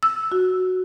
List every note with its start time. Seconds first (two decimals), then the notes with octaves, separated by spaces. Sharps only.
0.03 E6
0.32 F#4